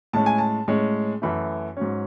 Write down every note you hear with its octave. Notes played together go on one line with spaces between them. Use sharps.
A2 G#3 C#4 A5
G#5
A5
A2 G#3 C#4
F#2 E3 A3 B5
G#2 F#3 C#4